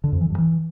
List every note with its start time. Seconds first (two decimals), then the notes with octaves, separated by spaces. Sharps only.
0.04 D3
0.12 F2
0.21 E3
0.30 G2
0.38 E3